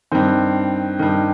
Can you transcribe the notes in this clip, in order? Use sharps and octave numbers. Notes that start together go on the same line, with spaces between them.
G2 D#3 C4
G2 D#3